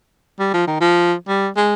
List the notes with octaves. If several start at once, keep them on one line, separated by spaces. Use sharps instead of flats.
G3
F3
D#3
F3
G3
G#3